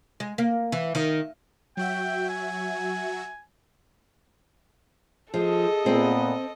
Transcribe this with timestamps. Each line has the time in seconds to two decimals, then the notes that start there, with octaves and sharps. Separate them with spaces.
0.20 G#3
0.38 A#3
0.72 E3
0.95 D#3
1.77 F#3 F#4 E5 G5
2.29 G#5
5.34 F3 G#4 A4 D#5
5.86 A#2 B3 C4